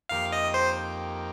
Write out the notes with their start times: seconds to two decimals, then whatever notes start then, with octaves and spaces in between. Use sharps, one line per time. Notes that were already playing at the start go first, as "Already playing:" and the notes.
0.09 F2 D#3 A#3 G4 F5
0.32 D#5
0.54 C5